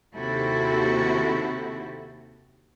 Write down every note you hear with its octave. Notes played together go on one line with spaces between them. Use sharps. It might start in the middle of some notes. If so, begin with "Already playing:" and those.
D#2 C3 C4 E4 F#4 A4